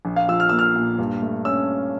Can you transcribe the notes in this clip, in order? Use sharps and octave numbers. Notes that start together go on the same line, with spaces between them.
A#1
F5
F3 E6
F6
A#3 E6
F6
A#2
G2
A3
C#4 E6